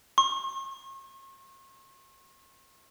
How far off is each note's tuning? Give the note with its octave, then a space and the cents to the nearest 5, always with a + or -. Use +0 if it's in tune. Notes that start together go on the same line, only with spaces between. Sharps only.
C#6 -45